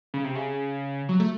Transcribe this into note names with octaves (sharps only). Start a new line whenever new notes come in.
C#3
C3
C#3
F#3
A3